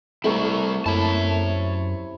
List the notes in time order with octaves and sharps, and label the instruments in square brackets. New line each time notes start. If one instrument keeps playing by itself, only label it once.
[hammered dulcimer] C3 [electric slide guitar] G3 E4 [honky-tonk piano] A3 A#4 C#6
[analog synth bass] F#2 [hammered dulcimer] E4 [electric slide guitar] C#5 A5